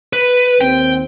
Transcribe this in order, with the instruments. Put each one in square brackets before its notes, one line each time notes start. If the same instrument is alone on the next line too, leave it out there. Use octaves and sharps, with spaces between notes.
[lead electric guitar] B4
[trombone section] D#2 C4 [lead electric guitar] G5